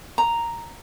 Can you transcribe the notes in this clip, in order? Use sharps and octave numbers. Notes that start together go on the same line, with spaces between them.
A#5